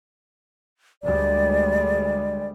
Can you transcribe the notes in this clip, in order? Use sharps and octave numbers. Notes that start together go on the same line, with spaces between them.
D2 G3 G#3 D5